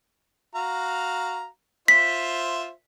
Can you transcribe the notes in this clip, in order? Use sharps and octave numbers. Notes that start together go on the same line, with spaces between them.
F#4 F5 A#5
F4 C5 E5 B6